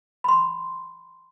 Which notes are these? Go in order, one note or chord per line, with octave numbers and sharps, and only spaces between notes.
B5 C6